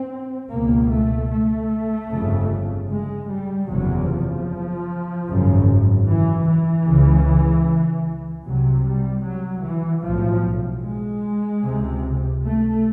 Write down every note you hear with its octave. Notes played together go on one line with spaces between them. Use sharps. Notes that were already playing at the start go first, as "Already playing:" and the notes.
Already playing: C4
C#2 B2 A#3
A3
A3
G1 F2 C#3
G#3
G3
F#1 E2 C3 F#3
F3
G#1 F#2 C#3
E3
E3
C#2 C#3
C2 C3 F#3
G3
F#3
E3
B1 A2 F3
G#3
C#2 C3
A3